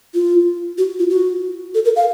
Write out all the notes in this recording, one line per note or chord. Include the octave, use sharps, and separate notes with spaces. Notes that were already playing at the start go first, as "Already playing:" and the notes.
F4
F#4
F4
F#4
A4
A#4
F5